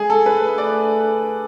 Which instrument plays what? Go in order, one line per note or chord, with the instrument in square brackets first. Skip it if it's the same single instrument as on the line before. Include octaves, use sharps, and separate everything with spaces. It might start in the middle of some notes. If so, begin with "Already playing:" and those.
Already playing: [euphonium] G#3 [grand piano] G#4
[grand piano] A4
B4
[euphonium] A3
[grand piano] D5